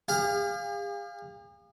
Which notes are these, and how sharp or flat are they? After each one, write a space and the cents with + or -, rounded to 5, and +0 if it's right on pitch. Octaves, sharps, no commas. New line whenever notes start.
G#4 -45 F5 +0